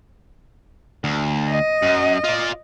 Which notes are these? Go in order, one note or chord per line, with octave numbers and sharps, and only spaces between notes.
D2
D#5
F#2
F4 D5